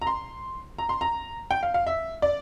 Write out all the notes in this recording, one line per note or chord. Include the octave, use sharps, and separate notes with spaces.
A#5
C6
A#5
C6
A#5
G5
F5
F5
E5
D5